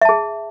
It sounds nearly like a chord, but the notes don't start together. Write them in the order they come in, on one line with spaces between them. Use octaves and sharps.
E5 A5 G#4